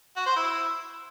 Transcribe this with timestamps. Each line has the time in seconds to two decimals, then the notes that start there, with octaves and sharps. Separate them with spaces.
0.16 F#4
0.26 C5
0.36 E4